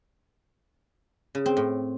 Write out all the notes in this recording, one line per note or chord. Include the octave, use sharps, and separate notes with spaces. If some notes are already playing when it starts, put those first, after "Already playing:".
C#3
C4
A2